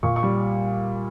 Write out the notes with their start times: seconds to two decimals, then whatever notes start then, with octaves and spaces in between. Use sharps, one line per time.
0.03 A#2 C#6
0.16 C#6
0.23 G3